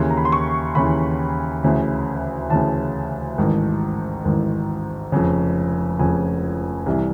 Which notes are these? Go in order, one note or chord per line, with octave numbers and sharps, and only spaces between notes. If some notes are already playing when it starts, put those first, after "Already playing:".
Already playing: D#2 C#3 E3 C6
A#5
B5
C6
C#6
D#2 C#3 E3 B5
D2 C#3 E3
D2 C#3 E3 A5
A1 G#2 D#3
A1 G#2 D#3
F1 F2 C#3
F1 F2 C#3 G#5
C2 C3 E3